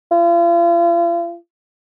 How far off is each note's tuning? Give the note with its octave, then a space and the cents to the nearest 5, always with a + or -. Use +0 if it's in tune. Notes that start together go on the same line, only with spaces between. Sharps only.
F4 -40